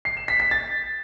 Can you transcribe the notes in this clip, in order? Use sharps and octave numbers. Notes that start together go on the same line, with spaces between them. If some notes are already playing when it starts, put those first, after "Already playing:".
C7
E7
B6
B6
A6